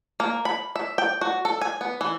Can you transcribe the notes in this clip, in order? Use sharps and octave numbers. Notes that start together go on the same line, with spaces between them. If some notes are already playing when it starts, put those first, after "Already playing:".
A#3
B5
E5
G5
F#4
A4
G#5
B3
E3